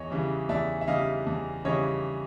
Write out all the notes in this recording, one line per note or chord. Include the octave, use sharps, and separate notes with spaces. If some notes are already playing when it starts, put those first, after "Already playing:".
Already playing: E2 C#5 D#5
C#3 E3 G3
E2 D5 E5
E5
C#3 E3 G3 D#5 F5
E2
C#3 E3 G3 C#5 D#5